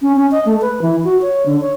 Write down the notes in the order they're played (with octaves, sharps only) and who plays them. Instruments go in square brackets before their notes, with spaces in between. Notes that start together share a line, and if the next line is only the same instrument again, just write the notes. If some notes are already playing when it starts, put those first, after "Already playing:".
[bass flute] C#4
C#4
D#5
A3
B4
E3
F#4
C#5
D3
C#5